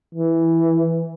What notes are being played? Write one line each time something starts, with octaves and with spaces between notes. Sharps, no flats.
E3